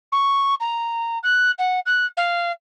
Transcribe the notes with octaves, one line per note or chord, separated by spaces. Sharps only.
C#6
A#5
F#6
F#5
F#6
F5